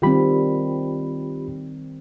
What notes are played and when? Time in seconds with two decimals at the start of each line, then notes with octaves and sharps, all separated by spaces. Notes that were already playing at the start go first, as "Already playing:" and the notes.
0.02 D#3 G3 C4 F4 G4 B5